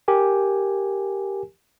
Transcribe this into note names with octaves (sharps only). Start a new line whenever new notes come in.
G4 A#4 G#5